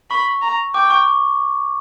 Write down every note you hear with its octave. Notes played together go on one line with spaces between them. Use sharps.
B5 C#6
A#5
G5 D6
C#6